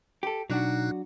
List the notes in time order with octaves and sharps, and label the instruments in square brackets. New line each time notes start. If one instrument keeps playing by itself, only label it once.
[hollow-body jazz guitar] G4 A4
[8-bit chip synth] B2 D#4 F#6 [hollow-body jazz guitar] F#3 D4 F#4